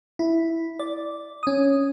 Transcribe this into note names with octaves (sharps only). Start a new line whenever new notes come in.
E4
D5
C#4 D#6